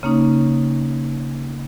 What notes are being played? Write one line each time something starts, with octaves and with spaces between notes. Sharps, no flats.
C#3 A#3 C#4 D#4